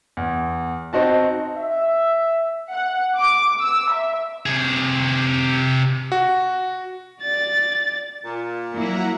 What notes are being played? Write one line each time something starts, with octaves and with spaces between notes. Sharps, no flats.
E2
C4 D#4 F#4 A5
E5
F#5
D6
E6
E5
C3 G#4
F#4
D5 A6
A#2
F#3 A#3 E4 F#5 A#5